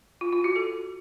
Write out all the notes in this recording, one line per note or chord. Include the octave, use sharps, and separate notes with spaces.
F4
F4
F#4
A4